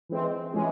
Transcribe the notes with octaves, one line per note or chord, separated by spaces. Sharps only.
E3 G#3 C4
E3 G#3 C#4 G#4